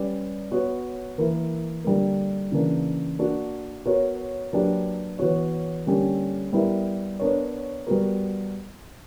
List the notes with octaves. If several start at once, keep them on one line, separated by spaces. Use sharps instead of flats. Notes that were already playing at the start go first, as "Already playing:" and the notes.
Already playing: G3 C#4 G4 B4 D5
B3 F#4 C#5
E3 A#3 E4 A#4
D3 G3 A#3
C#3 E3 A#3 D4
A#3 D4 F#4
B3 F#4 A#4 C#5
F#3 A#3 D4 G4 B4
E3 B3 F#4 C#5
D3 G3 A#3 C#4 G4
G3 B3 E4 A#4
B3 D4 A#4 C#5
G3 B3 F#4 A#4